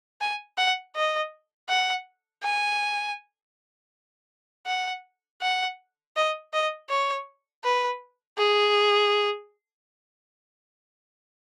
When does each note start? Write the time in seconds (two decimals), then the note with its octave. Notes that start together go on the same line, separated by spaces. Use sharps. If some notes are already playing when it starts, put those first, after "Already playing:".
0.21 G#5
0.58 F#5
0.95 D#5
1.69 F#5
2.43 G#5
4.67 F#5
5.42 F#5
6.16 D#5
6.53 D#5
6.90 C#5
7.64 B4
8.38 G#4